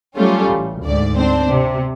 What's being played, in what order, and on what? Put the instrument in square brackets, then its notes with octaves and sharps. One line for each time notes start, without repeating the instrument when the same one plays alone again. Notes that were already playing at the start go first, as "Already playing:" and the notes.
[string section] F#3 G3 A3 C#4 F4
A1
D2 G#2 D5
C4 D4 C5
C3